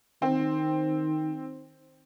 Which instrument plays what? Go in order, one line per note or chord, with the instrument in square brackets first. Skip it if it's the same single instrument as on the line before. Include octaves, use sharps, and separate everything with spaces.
[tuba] D#3 [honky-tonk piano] C4